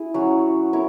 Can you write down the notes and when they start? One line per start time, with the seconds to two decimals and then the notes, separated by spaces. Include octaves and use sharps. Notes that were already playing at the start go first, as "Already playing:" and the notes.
Already playing: E4 G#4
0.14 F#3 C#4 F#4
0.73 E4 A#4 C#5